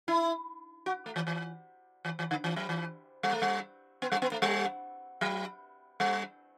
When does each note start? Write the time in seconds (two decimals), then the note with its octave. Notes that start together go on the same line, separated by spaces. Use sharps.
0.08 E4
0.86 F#4
1.06 A3
1.16 E3
1.27 E3
2.05 E3
2.19 E3
2.31 D3
2.44 E3
2.56 F#3
2.69 E3
3.23 G3
3.33 A3
3.42 G3
4.02 B3
4.12 G3
4.22 B3
4.32 A3
4.42 G3
5.21 F#3
6.00 G3